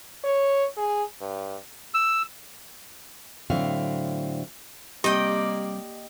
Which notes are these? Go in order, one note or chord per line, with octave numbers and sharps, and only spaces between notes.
C#5
G#4
G2
E6
A2 D3 F#3 C4 E5 F5
C3 G3 A#3 G4 D5 D#5 G5